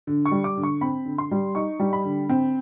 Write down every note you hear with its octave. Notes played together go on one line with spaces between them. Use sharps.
D3
C#6
G3
D6
D3
C#6
C4 B5
D3
C6
G3
D#4 C#6
G3
B5
D3
C4